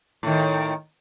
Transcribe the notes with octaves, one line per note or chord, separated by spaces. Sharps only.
A2 D#3